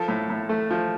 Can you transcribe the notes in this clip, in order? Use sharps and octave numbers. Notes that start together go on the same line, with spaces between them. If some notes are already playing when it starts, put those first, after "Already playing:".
Already playing: F3 A4
A2
A2
A3
F3